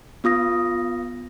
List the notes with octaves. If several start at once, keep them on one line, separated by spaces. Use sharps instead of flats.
B3 F4 D#6 A#6